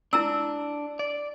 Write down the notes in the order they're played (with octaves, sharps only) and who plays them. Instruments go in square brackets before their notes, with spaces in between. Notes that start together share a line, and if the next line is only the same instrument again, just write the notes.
[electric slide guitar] D4 [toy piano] E4 A#5 E6
[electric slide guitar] D5